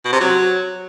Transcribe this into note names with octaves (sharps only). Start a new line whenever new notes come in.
B2
C3
F#3